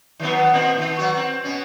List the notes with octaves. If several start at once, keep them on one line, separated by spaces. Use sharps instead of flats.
D#3 F#3 B3
A#2 C4
D#3
F#3 F#4
C4
B2 C#4